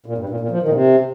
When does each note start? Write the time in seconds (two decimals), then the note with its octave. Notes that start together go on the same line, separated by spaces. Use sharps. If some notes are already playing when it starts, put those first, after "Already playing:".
0.06 A#2
0.18 G2
0.29 A#2
0.40 A#2
0.51 F3
0.62 D#3
0.68 A#2
0.73 C3